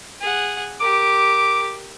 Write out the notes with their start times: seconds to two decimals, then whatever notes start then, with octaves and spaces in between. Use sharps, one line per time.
0.21 G#4 F#5
0.80 G4 A#4 D6